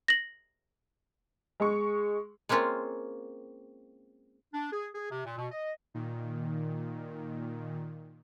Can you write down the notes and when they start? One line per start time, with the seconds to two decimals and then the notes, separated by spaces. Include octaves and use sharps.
0.08 A#6 F#7
1.60 G#3 C#6
2.49 G#3 A#3 C4 C#4 F4
4.54 D4
4.71 G#4
4.95 G#4
5.10 C3
5.25 A#2
5.38 B2
5.52 D#5
5.94 A#2 D#3